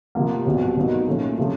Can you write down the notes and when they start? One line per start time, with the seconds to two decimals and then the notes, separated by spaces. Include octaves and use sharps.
0.15 C3 F3 A#3
0.45 C2 B2 F#3
0.76 B2 F#3 A#3 D#4
1.07 A#2 F3 A3 C#4
1.37 C3 F3 A3 C#4 F4